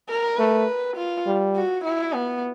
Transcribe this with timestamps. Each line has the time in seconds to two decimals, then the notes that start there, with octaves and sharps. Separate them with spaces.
0.09 A#4
0.37 A3 B4
0.96 F4
1.26 G3
1.56 F#4
1.84 E4
2.14 B3